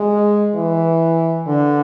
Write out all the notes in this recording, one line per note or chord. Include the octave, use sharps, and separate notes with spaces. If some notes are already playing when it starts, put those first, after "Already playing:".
Already playing: G#3
E3
D3